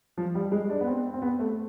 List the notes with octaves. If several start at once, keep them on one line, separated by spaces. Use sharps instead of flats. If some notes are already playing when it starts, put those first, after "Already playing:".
F3
G3
G#3
D4
B3
C4
C4
B3
A3